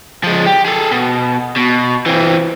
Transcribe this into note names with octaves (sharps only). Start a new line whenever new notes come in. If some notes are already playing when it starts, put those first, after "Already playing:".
F3 G#3
G4
G#4 A4
B2
B2
E3 C4